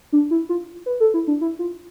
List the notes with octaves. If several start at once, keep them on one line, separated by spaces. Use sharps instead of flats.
D4
E4
F4
B4
A4
E4
D4
E4
F4